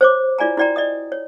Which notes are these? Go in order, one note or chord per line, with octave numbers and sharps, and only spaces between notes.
C5 C#5 D6
E4 F4 D5 G#5 A#5
E4 F#4 D5 G5 A#5
D5 D#5 D#6
C#5